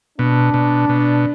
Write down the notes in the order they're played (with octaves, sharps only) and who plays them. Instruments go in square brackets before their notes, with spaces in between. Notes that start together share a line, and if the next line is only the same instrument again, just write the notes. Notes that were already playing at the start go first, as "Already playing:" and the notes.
[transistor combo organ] B2 [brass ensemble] D4
[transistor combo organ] B2
B2